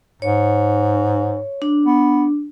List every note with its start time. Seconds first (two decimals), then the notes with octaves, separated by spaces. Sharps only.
0.22 G#2 C#5
1.62 D4
1.85 B3